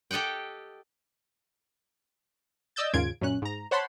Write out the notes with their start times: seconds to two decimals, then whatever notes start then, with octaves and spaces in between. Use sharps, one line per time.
0.11 G4 A4 D#5 F#5 G5
2.76 D5 D#5 E6 G6 A6
2.93 D#2 G#2 C#3 F4 G#6 D7
3.21 F#2 A#2 C#4 F#6
3.42 G#2 A#5
3.71 C5 C#5 F#5 A5 B5 C6